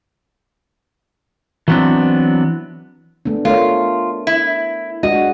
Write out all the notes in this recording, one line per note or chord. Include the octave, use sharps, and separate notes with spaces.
E3 F#3 B3 C4 D4
A3 B3 D4
A3 F4 A#4 C#5
E4
G#3 D4 F#4 D#5